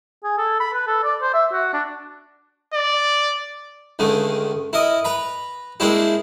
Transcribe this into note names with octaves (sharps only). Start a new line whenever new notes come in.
G#4
A4
B5
B4
A4
D5
C5
E5
F#4
D4
D5
C#2 D3 D#3 A3
E4 A#4 D#5
B4 A#5 B5
G#3 A#3 C4 D4 E4 G4